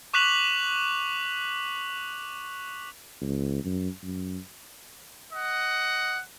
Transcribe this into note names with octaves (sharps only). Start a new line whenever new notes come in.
C#6 D6 F#6 B6 F7 F#7
C#2
F#2
F#2
D#5 F#5